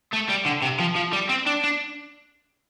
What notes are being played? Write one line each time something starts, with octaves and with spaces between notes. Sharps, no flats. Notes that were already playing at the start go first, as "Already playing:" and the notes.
A3
G3
D3
C3
F3
F3
G3
C4
D4
D4